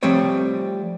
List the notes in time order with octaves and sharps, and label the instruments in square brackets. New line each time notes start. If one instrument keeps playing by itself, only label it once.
[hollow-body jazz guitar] F3 G3 A3 C4 C#5